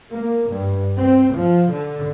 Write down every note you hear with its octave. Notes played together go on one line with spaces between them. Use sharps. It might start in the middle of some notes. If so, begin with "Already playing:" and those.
A#3
G2
C4
F3
D3